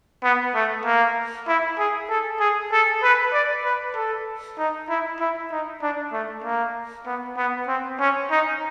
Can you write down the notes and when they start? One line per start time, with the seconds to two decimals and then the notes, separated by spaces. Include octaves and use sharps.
0.23 B3
0.54 A3
0.85 A#3
1.48 E4
1.78 G#4
2.10 A4
2.40 G#4
2.72 A4
3.03 B4
3.33 D5
3.64 B4
3.95 A4
4.58 D#4
4.89 E4
5.20 E4
5.51 D#4
5.82 D4
6.12 A3
6.44 A#3
7.06 B3
7.37 B3
7.68 C4
7.99 C#4
8.31 D#4